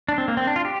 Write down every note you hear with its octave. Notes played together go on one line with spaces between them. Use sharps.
D4
C4
A#3
C4
D4
F4
G4